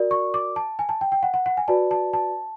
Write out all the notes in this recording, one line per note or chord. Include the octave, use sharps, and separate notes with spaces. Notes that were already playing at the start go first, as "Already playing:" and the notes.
Already playing: F#4 A#4 D5
C#6
D6
A5
G#5
A5
G5
G5
F#5
F#5
F#5
G#5
F#4 B4 D5 A5
A5
A5